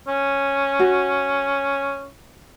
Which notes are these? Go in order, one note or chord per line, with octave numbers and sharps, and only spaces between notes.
C#4
F#4